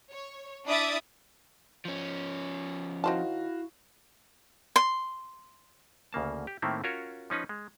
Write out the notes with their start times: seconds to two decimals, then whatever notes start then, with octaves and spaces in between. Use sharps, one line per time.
0.12 C#5
0.66 D4 E4 D5 E5 D#6 A6
1.85 F3 C#4
3.04 D#3 E4 F#4 C5 F5 A5
4.76 C6
6.13 D2 C#3 A#3 A5
6.47 G4
6.62 A2 D#3 A3 A#3 C4 E4
6.84 C#4 F4 F#4 A#4 C#5
7.30 F3 C#4 D#4 B4
7.49 G#3